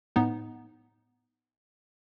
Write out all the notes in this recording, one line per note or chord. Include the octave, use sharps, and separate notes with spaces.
A2 B3 D#4